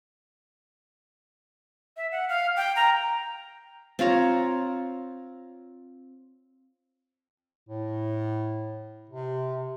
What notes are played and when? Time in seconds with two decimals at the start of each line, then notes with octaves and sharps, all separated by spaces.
1.97 E5
2.12 F#5
2.29 F5
2.57 G5
2.76 A#5
3.99 C4 F4 C#5 A#5
7.69 A2
9.10 C3